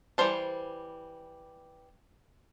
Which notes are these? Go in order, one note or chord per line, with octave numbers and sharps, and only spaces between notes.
E3 F#3 G3 C5 A5